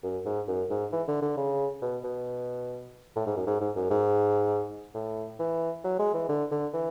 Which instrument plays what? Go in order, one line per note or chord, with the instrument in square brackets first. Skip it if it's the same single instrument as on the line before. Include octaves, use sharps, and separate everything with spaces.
[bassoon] F#2
G#2
F#2
G#2
E3
D3
D3
C#3
B2
B2
A2
G#2
F#2
G#2
G#2
F#2
G#2
A2
E3
F#3
G#3
E3
D3
D3
E3